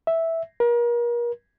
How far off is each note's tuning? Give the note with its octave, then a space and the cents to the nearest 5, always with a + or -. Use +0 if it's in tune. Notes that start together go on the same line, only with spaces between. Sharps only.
E5 -5
A#4 +35